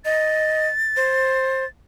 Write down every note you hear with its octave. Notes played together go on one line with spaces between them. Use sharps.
D#5 A6
C5